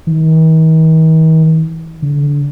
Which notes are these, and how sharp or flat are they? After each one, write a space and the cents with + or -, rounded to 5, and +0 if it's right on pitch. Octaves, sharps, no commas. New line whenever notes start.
D#3 +45
D3 -25